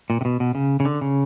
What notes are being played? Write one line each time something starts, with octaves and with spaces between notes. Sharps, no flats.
A#2
C3
B2
B2
C#3
C#3
D3
C#3